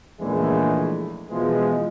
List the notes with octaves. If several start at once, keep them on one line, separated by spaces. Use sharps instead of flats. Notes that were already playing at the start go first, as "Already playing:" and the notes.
A#1 E2 C#3 E3 G#3 A3
B2 E3 F3 G#3